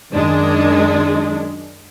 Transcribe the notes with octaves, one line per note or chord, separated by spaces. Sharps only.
F#2 D#3 G#3 D4